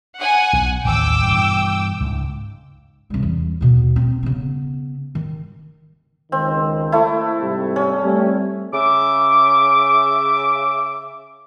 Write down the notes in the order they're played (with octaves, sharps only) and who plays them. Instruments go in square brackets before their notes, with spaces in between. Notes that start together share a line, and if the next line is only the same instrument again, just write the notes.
[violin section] F#5 G#5
[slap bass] B1
[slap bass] A1 D#2 [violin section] G5 D6 E6
[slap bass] G2 B2 E3
C#2 G#2
[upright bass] C2 G3
E2
D#2 B2
C4
C#3 B3
D#3
[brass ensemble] C#2 D#3 [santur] C4
[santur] A3 E4
[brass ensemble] G#2 C3 G3
[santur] C#4
[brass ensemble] G3 A3 C4
[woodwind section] C#3 E5 D6